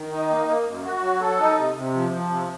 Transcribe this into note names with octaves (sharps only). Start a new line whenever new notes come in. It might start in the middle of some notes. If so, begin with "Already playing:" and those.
Already playing: D#3
D#4
A#3
A#3
F#2
F#4
F#3
A4
D#4
C3
C3
F3
F3
C3